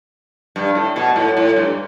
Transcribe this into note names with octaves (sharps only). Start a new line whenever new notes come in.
G2
A2
B2
A2
A2
G2